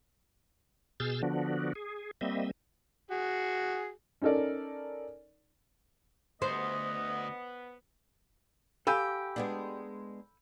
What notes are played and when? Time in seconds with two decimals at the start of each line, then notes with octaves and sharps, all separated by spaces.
1.00 B2 G#4 E6 F6 G6 A6
1.23 D3 F3 B3 D4 F#4
1.75 G#4
2.21 G3 A#3 C4 D#5 E5
3.11 F#4 G#4
4.22 C#4 D#4 A4 A#4 D5
6.42 D2 B3 C5 D#5
8.87 G4 A4 F5 G#5 B5 E6 G6
9.36 G#3 B3 D4